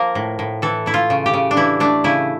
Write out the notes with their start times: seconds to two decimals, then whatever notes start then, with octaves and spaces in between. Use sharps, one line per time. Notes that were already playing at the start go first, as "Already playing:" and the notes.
Already playing: F3 A#3 A#4
0.15 A2
0.39 A2
0.62 E3 A4
0.86 A3 E4
0.94 F4
1.10 C#3
1.26 G4
1.33 C#3
1.51 D4
1.56 E3 E4
1.80 A3 D4
2.04 C#3 E4